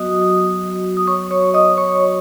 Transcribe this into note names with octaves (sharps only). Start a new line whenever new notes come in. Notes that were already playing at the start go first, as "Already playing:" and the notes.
Already playing: F#3 B3 F#4 D#5 D#6
D#6
C#5 C#6
C#5 C#6
D#5 D#6
C#5 C#6